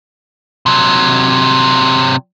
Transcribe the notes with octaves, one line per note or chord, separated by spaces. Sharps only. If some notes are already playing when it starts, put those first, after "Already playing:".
C3 F#3